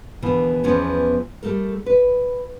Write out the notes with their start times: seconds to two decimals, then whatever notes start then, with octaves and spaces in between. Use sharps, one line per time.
0.22 D#2 B2 D3 E3
0.64 E2 E3 F3 B3 C#4
1.43 G3 A3 A4 A#4
1.86 B4